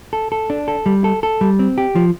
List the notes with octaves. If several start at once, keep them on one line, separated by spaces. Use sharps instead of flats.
A4
A4
D4
A4
G3
A4
A4
G3
C4
G4
F3